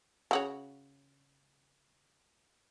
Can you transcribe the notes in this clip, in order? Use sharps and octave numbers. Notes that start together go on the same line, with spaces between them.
C#3 F#4 C#5